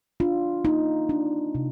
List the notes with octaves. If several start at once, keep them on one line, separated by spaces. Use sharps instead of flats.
D4 F4
A#3 D#4
D4
C3